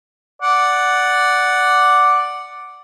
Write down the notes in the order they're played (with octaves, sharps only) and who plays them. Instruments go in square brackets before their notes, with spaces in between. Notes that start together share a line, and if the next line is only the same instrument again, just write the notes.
[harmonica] D5 F#5